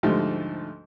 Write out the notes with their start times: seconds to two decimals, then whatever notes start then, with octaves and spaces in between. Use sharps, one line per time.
0.03 D2 G#2 F3 G3 A3